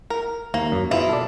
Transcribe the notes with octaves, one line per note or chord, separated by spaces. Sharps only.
A#4
D#2 A#3
F#2
B2 E4 F4 G#4
A4 D5